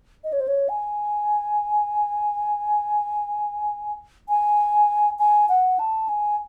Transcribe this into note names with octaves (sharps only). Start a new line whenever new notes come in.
D#5
C#5
C5
C#5
G#5
G#5
G#5
F#5
A5
G#5